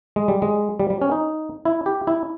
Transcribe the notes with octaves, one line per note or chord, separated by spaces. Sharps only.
G#3
G3
G#3
G3
G3
C#4
D#4
E4
G4
E4